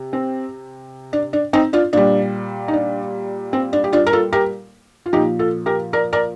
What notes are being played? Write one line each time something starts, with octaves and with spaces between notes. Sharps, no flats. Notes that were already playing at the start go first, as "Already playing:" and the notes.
Already playing: C3
C4
D4
D4
C4 D#4
D4 F4
A#2 G3 D4
D#4
D4
C4
D4
G4
D4 F4
A#4
F4 A4
G4 A#4
F4
A#2 F3 D#4 G4
F4 A4
G4 A#4
A#4 D5
A#4 D5